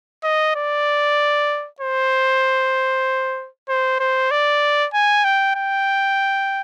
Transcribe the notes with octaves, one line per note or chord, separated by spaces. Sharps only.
D#5
D5
C5
C5
C5
D5
G#5
G5
G5